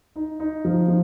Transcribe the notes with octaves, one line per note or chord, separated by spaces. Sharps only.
D#4
D#4
F3
F3